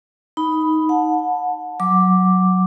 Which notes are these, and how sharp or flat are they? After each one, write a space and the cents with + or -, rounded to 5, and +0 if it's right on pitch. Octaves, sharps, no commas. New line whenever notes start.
D#4 +10 B5 +0
F#5 -30 A5 +0
F#3 +0 D6 +0